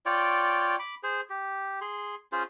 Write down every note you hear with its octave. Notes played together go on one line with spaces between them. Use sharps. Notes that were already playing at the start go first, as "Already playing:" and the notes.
F4 C#5 D5 G5
B5 D6
G#4 C5
G4
G#4 C6
C#4 F4 G#4 C5